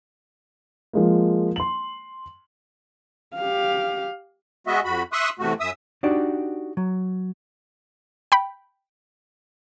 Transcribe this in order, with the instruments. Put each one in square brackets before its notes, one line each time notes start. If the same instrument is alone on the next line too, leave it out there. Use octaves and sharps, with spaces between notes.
[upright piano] F3 G#3 A#3
C6 F#7
[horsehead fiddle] G4 F5
[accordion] G#3 B3 F#4 D#5 E5
F2 F#4 B5
E5 C6 C#6 D#6 E6 F#6
E2 C3 A3 F#4
F#2 E5 D#6 E6
[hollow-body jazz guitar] D4 D#4 F#4 G4 D5
F#3
[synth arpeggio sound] G5 B5